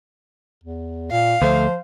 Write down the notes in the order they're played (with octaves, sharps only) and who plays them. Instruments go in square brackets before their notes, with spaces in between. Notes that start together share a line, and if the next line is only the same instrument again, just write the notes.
[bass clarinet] E2
[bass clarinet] A#2 [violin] F5
[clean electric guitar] D2 A3 [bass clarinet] F3 [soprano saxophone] C5